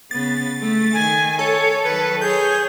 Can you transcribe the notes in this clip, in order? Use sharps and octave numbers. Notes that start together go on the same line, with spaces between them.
C#3 B3 A6
A3
D#3 G#5
A4 C#5
D#3 F#3 B4
G#4 C#5 G6